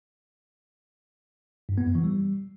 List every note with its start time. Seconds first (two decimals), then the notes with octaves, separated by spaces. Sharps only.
1.69 G2
1.78 B3
1.86 F#2
1.95 E3
2.04 G3